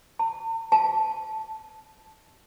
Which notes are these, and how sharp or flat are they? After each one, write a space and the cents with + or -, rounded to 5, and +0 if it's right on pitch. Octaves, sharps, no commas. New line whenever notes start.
A5 +45
A5 -10